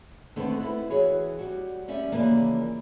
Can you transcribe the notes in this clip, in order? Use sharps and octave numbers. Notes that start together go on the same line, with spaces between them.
D3 D#3 A3 B3 C4
E4 B4
E3 F#4 G#4 C#5
G3 F#4
G3 C#4 D5 E5
C#3 E3 F3 A#3 D5